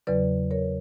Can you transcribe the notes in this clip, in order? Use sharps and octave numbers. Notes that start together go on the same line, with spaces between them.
E2 C#3 F#3 B4 D5
A#4 C#5